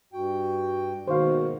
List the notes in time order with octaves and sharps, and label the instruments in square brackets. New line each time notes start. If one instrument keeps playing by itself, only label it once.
[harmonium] G2 G5 [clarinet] F#4
[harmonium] G#2 B2 A#3 [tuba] D#3 [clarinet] F#4 [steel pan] C5 F5